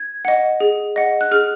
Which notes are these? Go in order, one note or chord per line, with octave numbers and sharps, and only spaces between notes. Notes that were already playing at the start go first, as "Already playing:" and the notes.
Already playing: G#6
D#5 F#5
G#4
D#5 F#5
F#6
G#4 F6